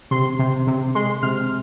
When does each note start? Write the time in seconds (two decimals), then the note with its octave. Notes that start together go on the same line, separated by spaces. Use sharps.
0.11 C3 C6
0.39 C3
0.67 C3
0.95 G#3 C6
1.23 C3 F6